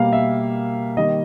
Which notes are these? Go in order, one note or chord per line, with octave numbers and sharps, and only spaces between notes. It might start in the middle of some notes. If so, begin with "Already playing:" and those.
Already playing: B2 G3 A#3 F5
E5
D#3 G3 A#3 D#5